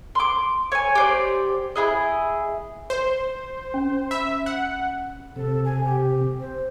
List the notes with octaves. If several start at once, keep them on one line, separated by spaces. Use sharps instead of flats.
C6 D6
C#5 G#5
G4 C5 D5
E4 G#4 D#5
C5
C#4
E5 B5
F#5
C3 A4
G#5
G4
C5